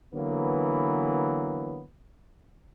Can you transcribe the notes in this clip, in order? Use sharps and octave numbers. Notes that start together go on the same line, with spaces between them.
D3 E3 F#3 A#3 B3